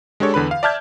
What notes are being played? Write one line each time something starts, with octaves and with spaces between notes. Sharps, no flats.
G#3 D4 G4 A4 C#5
E2 D3 B4 B5
F5
D5 E5 A5 F6 G6 G#6